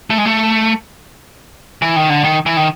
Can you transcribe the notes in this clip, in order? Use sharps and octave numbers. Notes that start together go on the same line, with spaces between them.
A3
G#3
A3
E3
D#3
D3
D#3
E3
D#3